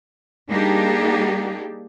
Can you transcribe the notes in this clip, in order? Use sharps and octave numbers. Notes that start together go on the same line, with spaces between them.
G3 A#3 D4 D#4 G4 G#4